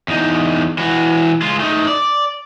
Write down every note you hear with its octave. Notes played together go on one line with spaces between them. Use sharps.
E2 D#4
E3 F#4
G#3 F4
A3 D#4
D5